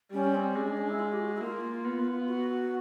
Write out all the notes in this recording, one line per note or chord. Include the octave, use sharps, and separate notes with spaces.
G3 C#4
C4
G#3 C#4
D4
C#4
E4
F4
G4
F#4
E4
A#3 F4
B3
F#4